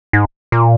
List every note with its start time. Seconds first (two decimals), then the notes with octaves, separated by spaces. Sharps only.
0.13 G#2
0.52 A#2